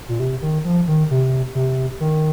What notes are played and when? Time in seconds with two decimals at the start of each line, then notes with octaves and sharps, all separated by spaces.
0.08 A#2
0.20 C3
0.42 D#3
0.65 F3
0.88 D#3
1.10 C3
1.55 C3
2.00 D#3